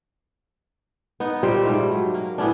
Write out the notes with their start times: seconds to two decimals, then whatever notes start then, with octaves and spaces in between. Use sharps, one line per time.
1.20 B3 D#4
1.43 A#2 G3 G4 C5
1.65 G#2 G3 A3
1.91 F#3
2.14 A#3
2.38 A2 B3 C#4 D4